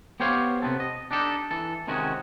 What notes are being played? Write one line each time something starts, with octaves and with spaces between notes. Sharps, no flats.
B3 G4 C5 C#5 F5
C3 B3 C4 A4
D#5
D4 D#4 G4 A4
E3 A4
C3 D#3 G#3 C#4 F#4